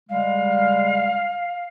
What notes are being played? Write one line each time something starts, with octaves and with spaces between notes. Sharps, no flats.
C#3 G3 G#3 F5